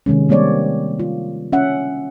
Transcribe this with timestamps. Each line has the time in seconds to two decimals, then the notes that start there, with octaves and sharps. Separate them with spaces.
0.06 C3 D#3 G#3 C#4
0.29 G3 A#3 C4 C#5 D5
1.00 F4
1.52 C#4 E5 F#5